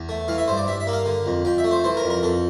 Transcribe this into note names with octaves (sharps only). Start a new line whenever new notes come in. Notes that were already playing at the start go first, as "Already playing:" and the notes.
Already playing: E2
A3
E3 F5
E5
G2 C5
D5
G2 E5
E5
A#3
F5
D3
F2
F2 G5
E5
A3
C5
E3 C5
A#4
F2
A#4
F2 A4